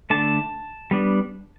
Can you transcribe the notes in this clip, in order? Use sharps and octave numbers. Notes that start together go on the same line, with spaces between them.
D3 A3 D4 A5
G3 B3 D4